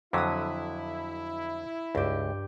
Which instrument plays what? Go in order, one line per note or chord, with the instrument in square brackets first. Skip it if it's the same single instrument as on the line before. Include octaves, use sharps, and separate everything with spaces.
[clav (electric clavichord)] F2 D3 F#3 [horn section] E4 [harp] D#6 B6
[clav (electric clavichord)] C#2 [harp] G2 G4